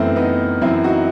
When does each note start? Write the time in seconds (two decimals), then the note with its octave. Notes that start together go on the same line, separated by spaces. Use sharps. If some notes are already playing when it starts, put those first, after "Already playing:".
Already playing: F#2 E3 A3 B3 C4
0.16 B3 D#4
0.61 F#2 E3 C4 E4
0.84 D#4 F#4